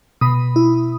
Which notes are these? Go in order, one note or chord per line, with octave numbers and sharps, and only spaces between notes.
B2 B5 D#6
E4